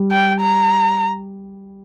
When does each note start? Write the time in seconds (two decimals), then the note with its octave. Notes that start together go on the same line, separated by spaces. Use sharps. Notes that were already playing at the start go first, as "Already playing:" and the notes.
Already playing: G3
0.12 G5
0.40 A#5